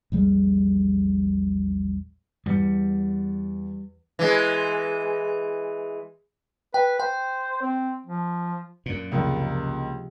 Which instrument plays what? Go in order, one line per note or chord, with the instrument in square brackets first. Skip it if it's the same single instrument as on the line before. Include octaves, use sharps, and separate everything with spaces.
[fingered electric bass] A#1 E2 G3 G#3
[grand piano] E2 C#7 [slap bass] G3
[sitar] E3 G#3
[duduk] B4 [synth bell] G5
[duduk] C5 [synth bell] G5
[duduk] C4
F3
[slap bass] F#2 A#2
[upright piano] C#2 A#3 [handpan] C3 F3 G#3